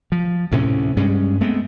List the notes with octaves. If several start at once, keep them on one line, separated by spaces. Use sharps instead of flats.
F3
D2 A2 C3 C#4
G2 G3 G#3 C#4
G#3 A3 B3 C4